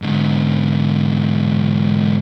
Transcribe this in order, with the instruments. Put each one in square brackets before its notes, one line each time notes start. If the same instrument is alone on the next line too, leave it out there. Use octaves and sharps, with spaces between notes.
[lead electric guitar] G#2 D3